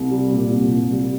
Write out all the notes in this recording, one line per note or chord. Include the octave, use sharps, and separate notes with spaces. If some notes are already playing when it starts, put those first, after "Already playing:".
Already playing: C2
G3
A#2
C2
C2
G3